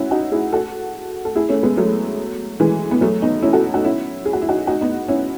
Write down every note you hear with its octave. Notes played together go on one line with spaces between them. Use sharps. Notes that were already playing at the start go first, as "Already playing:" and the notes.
Already playing: C#4 E4 F#4
D#4 F#4
E4 G#4
F#4 A4
A4
E4 G#4
A3 C#4
G#3 B3
F#3 A3
E3 G#3
B3
F#3 A3
B3 D#4
C#4 E4
F#4 A4
D#4 F#4
C#4 E4
G#4
F#4
E4
D#4 F#4
D#4 F#4
B3 D#4
C#4 E4